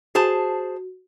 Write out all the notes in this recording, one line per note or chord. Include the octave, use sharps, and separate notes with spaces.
F#4 G#4 C5 A5